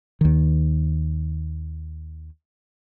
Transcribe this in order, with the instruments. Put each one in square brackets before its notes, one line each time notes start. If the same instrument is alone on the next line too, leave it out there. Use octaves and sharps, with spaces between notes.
[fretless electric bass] D#2 D#3